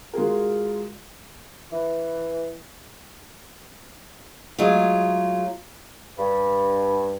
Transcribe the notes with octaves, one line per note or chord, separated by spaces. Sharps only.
G#3 F4 F#4 G#4 A#4
E3
F#3 G#3 A3 F4
G2